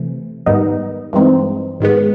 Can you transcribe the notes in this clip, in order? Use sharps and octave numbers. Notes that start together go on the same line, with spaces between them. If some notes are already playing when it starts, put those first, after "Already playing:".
Already playing: C3 E3 A3
G#2 D#3 G3 B3 D#4
G2 E3 G#3 C4 D#4
G#2 D#3 G#3 B3